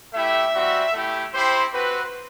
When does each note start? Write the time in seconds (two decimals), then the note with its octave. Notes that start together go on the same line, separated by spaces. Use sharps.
0.14 A3 E4 G4 E5
0.54 G3 C4 F#4
0.94 A3 E4 G4
1.34 C4 E4 G4 C5
1.74 C4 F#4 B4